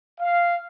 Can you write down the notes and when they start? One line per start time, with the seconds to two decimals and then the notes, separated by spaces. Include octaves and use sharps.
0.20 F5